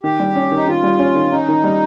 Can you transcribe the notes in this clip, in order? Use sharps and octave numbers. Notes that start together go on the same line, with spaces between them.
D#3 G4
G3
C#4
D#3 D#4
D#3 F4
G3
C#4
D#3
C#4 D#4
D#3
G3